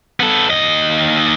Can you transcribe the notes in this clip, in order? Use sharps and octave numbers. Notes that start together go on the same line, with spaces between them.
B3 A4
D#2 D#5